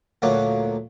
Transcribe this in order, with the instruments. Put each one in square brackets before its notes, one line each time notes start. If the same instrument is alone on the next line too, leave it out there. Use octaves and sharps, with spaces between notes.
[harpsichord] D2 A#2 F#3 A#3 D6